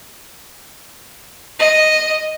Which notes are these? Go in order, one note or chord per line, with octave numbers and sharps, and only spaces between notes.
D#5